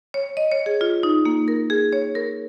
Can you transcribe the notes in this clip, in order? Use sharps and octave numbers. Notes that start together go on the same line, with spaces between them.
C#5
D#5
C#5
G#4
F4
D#4
A#3
A#4
G#4
C#5
A#4